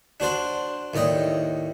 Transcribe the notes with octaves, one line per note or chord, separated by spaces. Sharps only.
D4 F#4 C5 D5
D#2 A2 D5 D#5 G5